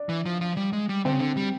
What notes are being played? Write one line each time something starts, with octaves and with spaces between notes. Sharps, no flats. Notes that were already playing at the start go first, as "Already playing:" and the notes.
Already playing: D4
E3
F3
F3
G3
G#3
G3
D3 C4
C#3
D3
G3